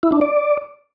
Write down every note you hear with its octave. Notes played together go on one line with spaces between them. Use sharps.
E4
D4
D5